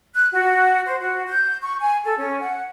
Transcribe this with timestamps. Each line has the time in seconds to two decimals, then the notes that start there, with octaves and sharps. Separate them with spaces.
0.15 F#6
0.33 F#4
0.86 C5
1.00 F#4
1.28 G6
1.62 C#6
1.81 G#5
2.04 A4
2.18 C#4
2.41 F#5